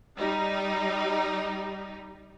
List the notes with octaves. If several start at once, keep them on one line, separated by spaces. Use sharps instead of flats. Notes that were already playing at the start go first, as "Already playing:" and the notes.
G3 D#4